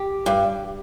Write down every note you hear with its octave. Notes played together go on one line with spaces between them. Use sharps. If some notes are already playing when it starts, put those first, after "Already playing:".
Already playing: G4
G2